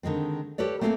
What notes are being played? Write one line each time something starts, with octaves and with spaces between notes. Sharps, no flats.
D3 D#3 G#3 C4
G4 A4 B4 C#5 D5
A3 A#3 C4 A4 F5 G#5